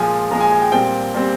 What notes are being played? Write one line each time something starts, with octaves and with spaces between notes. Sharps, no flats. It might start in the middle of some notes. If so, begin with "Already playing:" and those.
Already playing: A#2 F3 G#3 G#5
A#2 F3 G#3 A#5
G#5
G#5
G5
A#2 G3 C4 G5
A#2 G3 C4